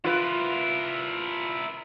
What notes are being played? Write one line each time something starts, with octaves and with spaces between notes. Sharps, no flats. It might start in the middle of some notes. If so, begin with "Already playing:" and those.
E4 F4 A#4 B4